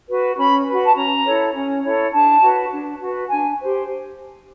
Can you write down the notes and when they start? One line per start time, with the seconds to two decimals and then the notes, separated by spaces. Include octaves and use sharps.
0.09 F#4 B4
0.38 C#4 B5
0.67 F#4 B4
0.84 A5
0.96 C#4 A#5
1.25 E4 A4 C#5
1.54 C#4
1.83 E4 A4 C#5
2.13 D4 A5
2.42 F#4 B4
2.71 D4
3.00 F#4 B4
3.29 D4 G#5
3.59 G4 C5